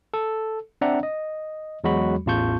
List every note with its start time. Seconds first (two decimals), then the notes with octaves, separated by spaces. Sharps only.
0.14 A4
0.81 C4 D4 D5 E5 F#5 A#5
1.03 D#5
1.84 E2 F#3 G#3 F#4 B5
2.26 A1 E2 F4 A5 C#6 G6